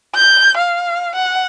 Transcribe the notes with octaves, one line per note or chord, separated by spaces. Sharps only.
G6
F5
F#5